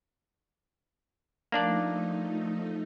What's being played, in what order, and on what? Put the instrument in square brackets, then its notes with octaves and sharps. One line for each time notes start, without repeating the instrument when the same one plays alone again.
[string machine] F3 A3 D#4 [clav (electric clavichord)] A#3 D4 D5